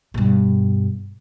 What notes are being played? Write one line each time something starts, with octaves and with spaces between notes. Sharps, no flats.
G2 B2